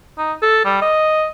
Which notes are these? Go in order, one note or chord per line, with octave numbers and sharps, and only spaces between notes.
D#4
A4
G3
D#5